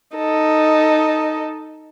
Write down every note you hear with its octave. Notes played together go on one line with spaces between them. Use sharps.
D#4 A4 D#5